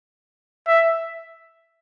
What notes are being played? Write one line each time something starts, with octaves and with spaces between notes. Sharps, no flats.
E5